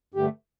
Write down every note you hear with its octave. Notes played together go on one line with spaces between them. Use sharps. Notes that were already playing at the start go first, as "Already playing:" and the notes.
G2 D3 A3 G4